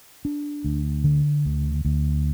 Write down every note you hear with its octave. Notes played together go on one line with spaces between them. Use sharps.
D4
D2
D3
D2
D2